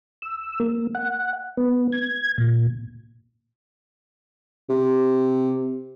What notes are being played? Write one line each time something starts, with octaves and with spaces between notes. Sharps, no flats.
E6
A#3
F#5
B3
G#6
A#2
C3